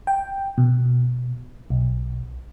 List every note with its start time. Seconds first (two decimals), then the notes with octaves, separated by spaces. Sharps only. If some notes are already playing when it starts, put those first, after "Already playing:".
0.07 G5
0.58 B2
1.70 B1